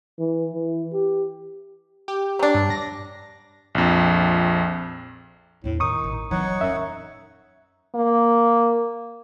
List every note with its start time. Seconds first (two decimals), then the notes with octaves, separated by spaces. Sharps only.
0.19 E3
0.54 E3
0.93 G4
2.08 G4
2.39 F#3 D4
2.55 G2
2.70 A#6
3.75 A#1 F2
5.64 E2 A2 D4
5.80 A2 D#3 D#4 C#6 D#6
6.04 A1
6.31 E3 F#3 C4 D#4 C#5 F#5
6.45 D#1
6.61 F#2 E5
7.95 A#3